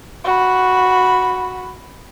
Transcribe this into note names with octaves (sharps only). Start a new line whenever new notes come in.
F#4 B5